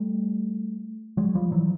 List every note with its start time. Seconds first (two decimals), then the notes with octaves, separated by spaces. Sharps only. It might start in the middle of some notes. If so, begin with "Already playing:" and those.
Already playing: G3 A3
1.17 F#3 G#3
1.35 F3 G3
1.52 E3 F#3